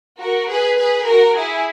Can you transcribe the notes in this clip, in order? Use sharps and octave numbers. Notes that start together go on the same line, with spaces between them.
F#4 A#4
G#4 B4
G#4 B4
F#4 A#4
E4 G#4